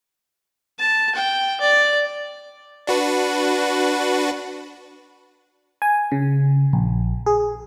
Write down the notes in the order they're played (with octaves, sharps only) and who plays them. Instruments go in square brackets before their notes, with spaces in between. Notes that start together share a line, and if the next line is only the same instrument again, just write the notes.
[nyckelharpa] A5
G5
D5
[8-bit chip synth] D4 F#4 B4
[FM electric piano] G#5
C#3
A#1
G#4